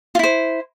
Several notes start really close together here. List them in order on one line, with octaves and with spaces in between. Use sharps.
F4 E4 C5